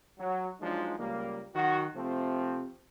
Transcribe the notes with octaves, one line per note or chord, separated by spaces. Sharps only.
F#3
F3 F#3 G#3 D4 D#4
C#2 G3 A#3
D#3 F#3 F#4
C3 F3 A3 C4